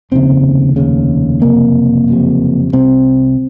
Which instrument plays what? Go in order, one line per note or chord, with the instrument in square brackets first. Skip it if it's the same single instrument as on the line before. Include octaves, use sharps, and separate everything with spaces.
[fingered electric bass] F1 D#2 C#3 C4
F1 D#2 C#3
F#1 F2 C3 A#3
F#1 F2 C3
C2 C3 C4